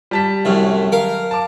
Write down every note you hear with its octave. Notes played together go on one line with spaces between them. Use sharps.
G3 A5 B6
C2 F#2 A2
A#4 F5
A5 D6